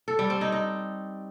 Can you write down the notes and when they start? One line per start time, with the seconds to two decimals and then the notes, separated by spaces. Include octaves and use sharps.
0.08 A4
0.19 G3
0.30 C4
0.41 D#4
0.52 D#4